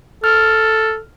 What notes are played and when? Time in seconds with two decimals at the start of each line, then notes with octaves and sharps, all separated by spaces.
0.24 A4 F6